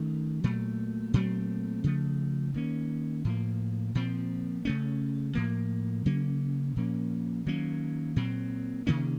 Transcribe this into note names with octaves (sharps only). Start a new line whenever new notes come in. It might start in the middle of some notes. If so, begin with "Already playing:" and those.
Already playing: D#3 A3 C#4
A#2 F#3 A3
A#2 F#3 A3 C4
C#3 F3 A3
D#3 A#3 C#4
A2 F3 A#3
A#2 F3 C4
C#3 A3 C#4
A2 F3 A#3
C#3 F#3 A#3 C#4
A#2 F3 A#3 C#4
D#3 F#3 A#3 C#4
A#2 F#3 C4
C3 D#3 A#3 C#4